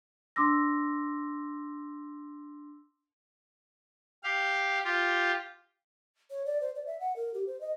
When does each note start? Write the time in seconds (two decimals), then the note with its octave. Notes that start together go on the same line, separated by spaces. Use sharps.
0.36 D4 C6 D6 E6 A#6
4.24 G4 F5
4.84 F4 G4
6.30 C#5
6.45 D5
6.61 C5
6.75 D5
6.86 E5
7.00 F#5
7.16 A#4
7.34 G4
7.47 C5
7.61 D#5